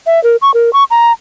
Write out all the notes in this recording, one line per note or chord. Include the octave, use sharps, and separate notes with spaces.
E5
A#4
C#6
A#4
C#6
A#5